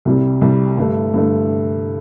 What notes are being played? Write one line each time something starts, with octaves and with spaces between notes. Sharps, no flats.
C2 C3 G3
C2 C3 G3
G2 D3 A3
G2 D3 A3